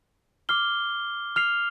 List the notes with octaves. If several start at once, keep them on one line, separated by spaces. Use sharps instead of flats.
D6 F6 C7 G7
F6 C7 F7